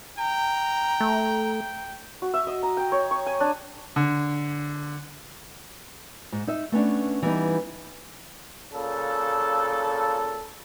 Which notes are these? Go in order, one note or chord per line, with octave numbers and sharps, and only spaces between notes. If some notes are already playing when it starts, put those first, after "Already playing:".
G5 A#5
A3
F#4
E5
D#5
A#5
G5
C#5
C#6
G#5
D4
D3
G#2
D#4 E5
A3 B3 C#4 D4
E3 G3 B3 D#4
A#2 C#3 A4